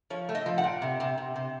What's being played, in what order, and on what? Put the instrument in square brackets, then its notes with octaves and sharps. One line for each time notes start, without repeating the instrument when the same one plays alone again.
[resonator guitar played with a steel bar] F3 C#5
A3
D#5
F3
F#5
A#2
C3
C3
C3
C3